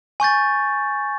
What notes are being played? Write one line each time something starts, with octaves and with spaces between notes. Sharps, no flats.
G#5 C#6 G6 A6